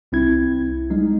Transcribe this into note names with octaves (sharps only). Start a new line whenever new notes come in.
C2 C4 E4 G#6
G3 G#3 D#4